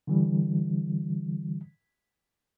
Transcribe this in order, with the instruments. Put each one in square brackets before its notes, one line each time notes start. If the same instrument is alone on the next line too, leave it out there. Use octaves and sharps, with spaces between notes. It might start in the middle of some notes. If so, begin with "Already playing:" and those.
[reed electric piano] D3 E3 G3